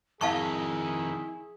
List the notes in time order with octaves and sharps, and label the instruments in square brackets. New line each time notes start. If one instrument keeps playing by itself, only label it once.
[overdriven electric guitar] F2 D#3 [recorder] E4 [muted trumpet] G#4 [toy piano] F5 A5 C#6